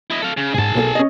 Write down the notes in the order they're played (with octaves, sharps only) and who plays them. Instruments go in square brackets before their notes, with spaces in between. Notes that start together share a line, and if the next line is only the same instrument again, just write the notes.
[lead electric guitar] E4 D#5
A4 F5
C#3
[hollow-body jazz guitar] B1 G#2 [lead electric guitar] G#4 A5
[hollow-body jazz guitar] B1 A#3 A4
C#4 D#5